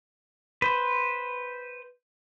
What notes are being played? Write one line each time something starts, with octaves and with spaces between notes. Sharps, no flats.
B4 C5